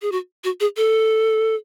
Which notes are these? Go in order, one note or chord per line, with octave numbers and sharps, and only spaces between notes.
G#4
F#4
F#4
G#4
A4